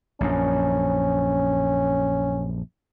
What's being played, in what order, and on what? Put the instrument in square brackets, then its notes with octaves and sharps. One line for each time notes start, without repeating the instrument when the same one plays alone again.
[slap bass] A#1 F#2 [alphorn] C#4